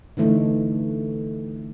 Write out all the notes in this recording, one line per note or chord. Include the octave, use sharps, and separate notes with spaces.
D3 E3 A3 D#4